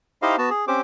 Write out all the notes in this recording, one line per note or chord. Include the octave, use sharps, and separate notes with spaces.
D#4 E4 G4 C5 D#5 F5
B3 F#4 A5
G#4
C4 C#4 G4 C5 D6